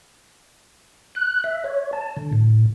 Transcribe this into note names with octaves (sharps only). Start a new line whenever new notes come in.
F#6
E5
C#5
A5
D3
A2